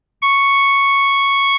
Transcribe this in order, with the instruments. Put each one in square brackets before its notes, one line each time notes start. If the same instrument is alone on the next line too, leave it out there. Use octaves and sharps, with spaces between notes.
[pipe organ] C#6